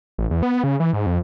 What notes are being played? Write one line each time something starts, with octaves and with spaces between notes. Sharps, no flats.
A1
E2
B3
C#3
E3
G#2
F2